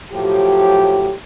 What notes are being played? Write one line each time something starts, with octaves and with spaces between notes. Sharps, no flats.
A2 F3 F#3 G4